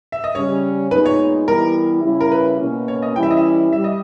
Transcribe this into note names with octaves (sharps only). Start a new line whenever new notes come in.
E5
D#5
C#3 G3 C#4 C#5
A#2 G#3 B3 D#4 B4
C#5
E3 G3 B3 E4 A#4
C#3 G3 C#4 E4
A#4
B4
B2 A#3 C#4
C#5
D#5
E3 G3 C#4 E4 G5
E5
D#5
E5
G3 E5
D#5